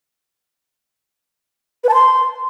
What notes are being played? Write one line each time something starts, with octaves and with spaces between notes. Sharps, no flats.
B4
A5
C6